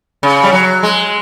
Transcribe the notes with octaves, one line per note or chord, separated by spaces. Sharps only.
C#3
G3
F#3
G#3